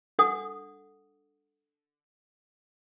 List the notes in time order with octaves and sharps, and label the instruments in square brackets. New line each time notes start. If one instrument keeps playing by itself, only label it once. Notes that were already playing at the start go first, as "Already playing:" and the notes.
[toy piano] D4 A4 F#5 D#6